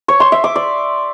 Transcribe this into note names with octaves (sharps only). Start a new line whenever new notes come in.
C#5
C6
E5
D6
D5